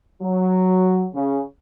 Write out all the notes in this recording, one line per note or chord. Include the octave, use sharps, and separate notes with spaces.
F#3
C#3